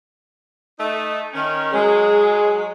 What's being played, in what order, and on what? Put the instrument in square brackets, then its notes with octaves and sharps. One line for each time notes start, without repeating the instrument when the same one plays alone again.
[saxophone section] A3 D#4
D#3 C#4
[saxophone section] F#3 G#3 [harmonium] G#4